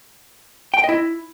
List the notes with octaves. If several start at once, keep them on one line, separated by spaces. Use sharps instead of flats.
G5
B4
D#5
E4